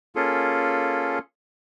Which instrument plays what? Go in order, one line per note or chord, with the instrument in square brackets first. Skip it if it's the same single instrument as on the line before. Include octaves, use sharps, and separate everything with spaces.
[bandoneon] A#3 C#4 F4 G#4 A4